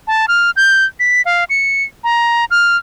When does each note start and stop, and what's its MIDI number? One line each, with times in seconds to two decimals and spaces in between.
0.07 0.26 81
0.28 0.51 89
0.56 0.85 91
1.00 1.22 95
1.25 1.44 77
1.50 1.83 97
2.04 2.45 82
2.51 2.77 89